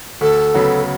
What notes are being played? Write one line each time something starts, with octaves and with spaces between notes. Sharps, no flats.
D2 A4
C#3 F#3 B3